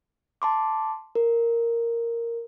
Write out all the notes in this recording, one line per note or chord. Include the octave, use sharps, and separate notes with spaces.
A5 C6 D6
A#4